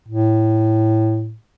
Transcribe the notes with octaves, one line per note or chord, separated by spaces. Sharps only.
A2